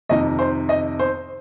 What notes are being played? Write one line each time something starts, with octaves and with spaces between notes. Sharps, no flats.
F2 C3 D#3 D#5
C5
D#5
C5